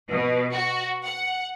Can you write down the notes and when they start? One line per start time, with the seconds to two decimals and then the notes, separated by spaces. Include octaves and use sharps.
0.10 B2
0.53 F#4
1.04 F#5